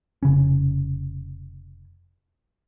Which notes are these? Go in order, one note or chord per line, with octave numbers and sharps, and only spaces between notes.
F1 C#3 C#4